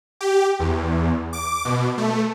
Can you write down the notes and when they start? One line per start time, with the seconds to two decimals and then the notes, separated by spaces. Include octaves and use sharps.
0.21 G4
0.60 E2
1.33 D6
1.65 B2
1.98 A3